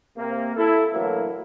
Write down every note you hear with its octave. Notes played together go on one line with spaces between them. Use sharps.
C3 A#3
E4 A4
A2 D3 E3 F#3 A#3